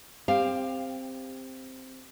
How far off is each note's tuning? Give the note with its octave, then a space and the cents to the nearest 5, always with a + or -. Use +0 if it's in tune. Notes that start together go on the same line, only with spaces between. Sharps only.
C4 +0 G4 +25 F5 +0